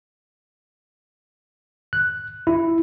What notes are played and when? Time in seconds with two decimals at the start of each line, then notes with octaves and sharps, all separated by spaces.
1.93 F#6
2.47 E4